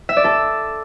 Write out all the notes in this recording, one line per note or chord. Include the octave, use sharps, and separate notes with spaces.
E5
D5
A4